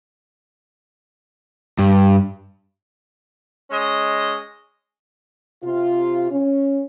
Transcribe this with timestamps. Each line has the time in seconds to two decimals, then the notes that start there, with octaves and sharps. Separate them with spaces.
1.79 G2
3.70 G#3 C#4 D#5
5.63 C3 F4
6.31 C#4